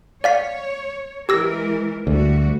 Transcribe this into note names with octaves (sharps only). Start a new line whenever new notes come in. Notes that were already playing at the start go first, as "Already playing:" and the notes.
C#5 D5 F5 B6
E3 G#3 G4 A#4 E6 A#6
D2 G3 A3 F#4